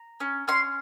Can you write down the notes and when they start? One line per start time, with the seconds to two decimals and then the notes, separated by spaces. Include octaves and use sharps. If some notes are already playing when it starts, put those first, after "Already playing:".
Already playing: A#5
0.20 C#4
0.48 C#4 C6